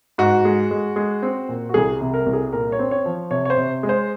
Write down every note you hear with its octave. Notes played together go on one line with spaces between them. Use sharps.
G#2 F#4
G#3
G#3
G#3
C4
A#2
F#4
C2 G#4
C3
A#4
C2
G#4
A#2 A#4
C#5
C4
C#5
F3
C3 C#5
C#5
C5
C3
G#3
C5